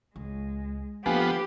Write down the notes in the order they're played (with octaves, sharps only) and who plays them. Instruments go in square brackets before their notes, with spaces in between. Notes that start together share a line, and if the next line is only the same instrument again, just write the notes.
[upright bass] C#2 [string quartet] G#3
[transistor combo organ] F3 B3 [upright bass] A#3 [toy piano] D4 A4 [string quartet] G4